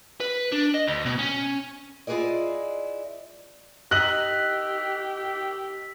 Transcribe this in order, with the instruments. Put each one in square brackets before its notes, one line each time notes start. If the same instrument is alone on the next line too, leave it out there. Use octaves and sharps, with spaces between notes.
[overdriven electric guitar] B4
D4
D#5
D2
B2
C#4
[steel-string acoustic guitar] E4 F4 G#4 B4 D5 D#5
[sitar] D#4 D#5 [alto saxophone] G4 [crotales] E6 B6 [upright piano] F#6 F#7